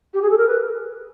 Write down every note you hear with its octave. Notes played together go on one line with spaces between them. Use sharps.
G4
G#4
A4
A#4
B4